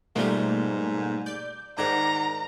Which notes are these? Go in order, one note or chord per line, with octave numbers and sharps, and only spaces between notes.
G#2 B2 F3 G3 A3 A#3 F4
D5 G6
G#2 D#3 D4 F#5 A#5 D6